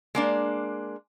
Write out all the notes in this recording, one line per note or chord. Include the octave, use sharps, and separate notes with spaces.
G#3 A#3 D4